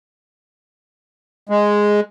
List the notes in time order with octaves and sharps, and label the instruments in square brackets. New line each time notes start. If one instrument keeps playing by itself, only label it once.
[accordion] G#3